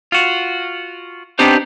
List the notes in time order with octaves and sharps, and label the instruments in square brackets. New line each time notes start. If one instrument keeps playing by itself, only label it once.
[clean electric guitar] F4 F#4
B3 C4 D4 D#4 G4 C5